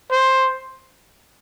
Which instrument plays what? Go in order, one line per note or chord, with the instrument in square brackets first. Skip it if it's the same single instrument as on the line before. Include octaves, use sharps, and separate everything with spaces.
[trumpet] C5